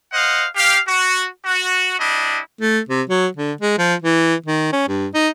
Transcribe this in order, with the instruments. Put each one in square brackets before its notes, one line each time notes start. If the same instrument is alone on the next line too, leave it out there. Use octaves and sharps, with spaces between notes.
[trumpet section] C5 D#5 F5 F#5
G4 F5
F#4
F#4
G3 D4 E4 D#5
[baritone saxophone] A3
C3
F#3
D3
G#3
F3
E3
D#3
C#4
G2
D#4